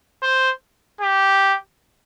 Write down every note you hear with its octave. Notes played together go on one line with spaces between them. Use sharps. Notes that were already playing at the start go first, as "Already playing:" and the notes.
C5
G4